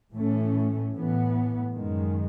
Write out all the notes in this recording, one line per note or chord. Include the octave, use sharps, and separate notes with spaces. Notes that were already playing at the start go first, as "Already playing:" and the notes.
A2 E3 A3 C#4
A2 E3 B3
F#2 D#3 G#3